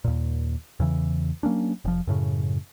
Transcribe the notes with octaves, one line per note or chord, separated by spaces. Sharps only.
D#2 A#2
E2 C#3 E3
F#3 A#3 C#4 D4
F1 F3
F#2 A2 C#3